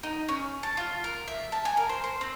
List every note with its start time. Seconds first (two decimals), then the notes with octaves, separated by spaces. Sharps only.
0.03 D#4
0.28 C#4
0.63 A5
0.77 F4
1.04 A#4
1.28 E5
1.52 A5
1.65 G#5
1.77 A#4
1.89 C5
2.04 C5
2.21 C4